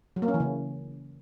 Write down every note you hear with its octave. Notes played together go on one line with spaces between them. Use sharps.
F#3
A#3
C#4
E3
C#3